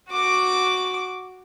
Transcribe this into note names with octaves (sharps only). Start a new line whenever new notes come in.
F#4 D6